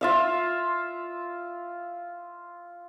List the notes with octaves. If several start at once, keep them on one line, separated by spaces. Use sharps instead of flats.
F4 E5 F5